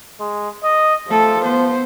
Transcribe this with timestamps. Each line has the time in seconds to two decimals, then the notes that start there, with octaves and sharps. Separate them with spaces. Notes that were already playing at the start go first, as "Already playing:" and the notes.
0.20 G#3
0.64 D#5
1.08 F3 A3 A4
1.43 B3 C5